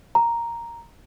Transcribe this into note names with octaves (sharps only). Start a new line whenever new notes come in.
A#5